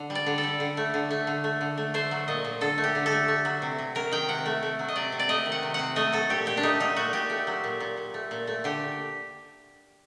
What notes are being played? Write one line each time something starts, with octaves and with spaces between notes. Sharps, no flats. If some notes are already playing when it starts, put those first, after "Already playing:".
Already playing: D3
G3
D5
D3
A4
G3
D3
A3
D3
A3
D3
A3
D3
A3
A3 C5
F#3
A#2 D#5
A#2
D3 A4
A3
G4
D3
A4
A3
A3
F#3
C3
C3
F#3 A#4
D#3 G5
C3 F#5
A3
A3
F#3
D#5
C3 D5
C3
D5
A3 D#5
D#3
F#5
C3
C3 F#5
A3 D#5
F#3 A4
A#2 G4
A#2 G4
D4
A3 D#4
F#3 D#4
A#2 F#4
A#2 G4
A3
F#3
A#2
A#2
A#2
A3
A#2
A3
D3 G4